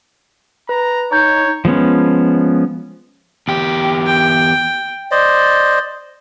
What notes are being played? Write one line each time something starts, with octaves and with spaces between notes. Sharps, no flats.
B4 A#5
D#4 C#5 A#5 G6
F3 G#3 B3 C#4
E2 G4
G5
C5 D5 D#5